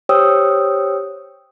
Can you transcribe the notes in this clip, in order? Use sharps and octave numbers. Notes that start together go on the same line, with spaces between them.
G4 C5 C#5 G5 D#6 E6